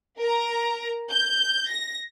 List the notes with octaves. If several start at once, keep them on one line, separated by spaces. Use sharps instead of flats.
A#4 A#5
G6
A#6